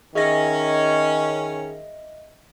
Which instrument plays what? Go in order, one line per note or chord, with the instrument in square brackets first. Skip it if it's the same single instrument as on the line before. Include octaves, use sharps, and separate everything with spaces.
[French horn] D#3 [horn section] C#4 [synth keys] G#4 [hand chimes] D#5 E5 A#6